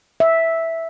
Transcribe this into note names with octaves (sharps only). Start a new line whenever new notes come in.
E5